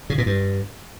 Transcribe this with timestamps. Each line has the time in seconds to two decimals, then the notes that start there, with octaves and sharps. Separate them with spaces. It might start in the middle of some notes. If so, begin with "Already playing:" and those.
0.10 C#3
0.18 A#2
0.26 G2